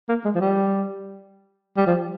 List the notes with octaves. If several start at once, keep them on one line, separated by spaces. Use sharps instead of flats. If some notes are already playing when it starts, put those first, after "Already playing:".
A#3
G#3
F3
G3
G3
F3